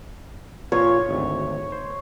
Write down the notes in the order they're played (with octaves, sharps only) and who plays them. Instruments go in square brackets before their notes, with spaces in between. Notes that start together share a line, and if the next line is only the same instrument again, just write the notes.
[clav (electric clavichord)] A#2 F3 F4 [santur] C#5
[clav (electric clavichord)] G#1 D2
C5